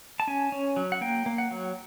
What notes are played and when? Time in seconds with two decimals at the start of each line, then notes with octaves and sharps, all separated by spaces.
0.20 A5
0.27 C#4 G#5
0.52 C#4
0.76 F#3
0.92 F#5
1.01 A#3 G5
1.26 A#3
1.38 F#5
1.51 F#3